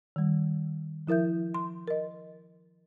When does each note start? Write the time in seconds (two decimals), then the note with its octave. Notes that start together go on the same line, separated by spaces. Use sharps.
0.16 D#3 G3
1.07 F3 E4 A#4 E5 G6
1.54 C6
1.88 A#4 D#5